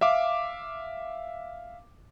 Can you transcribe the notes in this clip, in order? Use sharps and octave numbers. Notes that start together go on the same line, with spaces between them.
E5 F5 D6